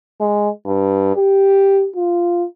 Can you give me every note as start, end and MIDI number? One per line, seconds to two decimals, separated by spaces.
0.20 0.49 56
0.66 1.15 43
1.16 1.88 67
1.96 2.45 65